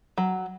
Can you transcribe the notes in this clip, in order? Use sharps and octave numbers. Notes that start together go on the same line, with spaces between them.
F#3